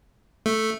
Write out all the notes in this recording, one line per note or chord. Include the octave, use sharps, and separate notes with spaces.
A3